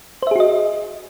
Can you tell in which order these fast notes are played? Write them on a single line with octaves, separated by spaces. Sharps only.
C5 E5 G#4 F#4 D#5